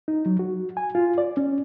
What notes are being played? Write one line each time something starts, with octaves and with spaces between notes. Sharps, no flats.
D#4
F#3
F#4
G#5
F4
D5
C#4